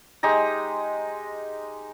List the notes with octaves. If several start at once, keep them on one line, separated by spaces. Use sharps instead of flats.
G#3 D#4 G4 A#5